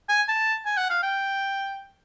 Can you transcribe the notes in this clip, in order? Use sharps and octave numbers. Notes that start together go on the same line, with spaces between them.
G#5
A5
G#5
F#5
F5
G5